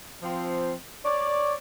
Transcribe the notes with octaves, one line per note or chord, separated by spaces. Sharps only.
F3 C4
C#5 D5